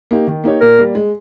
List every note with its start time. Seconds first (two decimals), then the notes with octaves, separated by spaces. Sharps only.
0.11 A#3 D#4 G4
0.27 D#3
0.44 A#3 D#4 G4 C#5
0.61 A#2 A#4
0.78 G3 A#3
0.95 G#3